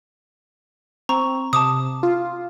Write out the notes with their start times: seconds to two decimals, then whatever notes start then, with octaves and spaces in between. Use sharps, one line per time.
1.09 C4 A#5 C#6
1.53 C3 A5 D6 D#6
2.03 F4